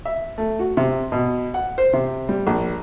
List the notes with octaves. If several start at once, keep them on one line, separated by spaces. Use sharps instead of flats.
E5
A3
F#4
C3
B2
F#5
C5
C3
G3
A#1